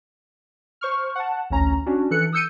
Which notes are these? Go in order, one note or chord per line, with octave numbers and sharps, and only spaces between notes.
C5 C#6 F6
F#5 A5
A1 D2 C#4 A#5
C#4 D4 F#4
E3 A4 F#6 C#7
D#6 E6 G6 C#7 D#7